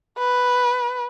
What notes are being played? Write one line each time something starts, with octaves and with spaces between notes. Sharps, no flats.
B4